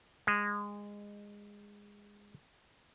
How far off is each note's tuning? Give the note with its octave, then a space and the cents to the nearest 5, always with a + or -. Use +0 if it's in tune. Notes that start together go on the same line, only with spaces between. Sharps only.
G#3 -20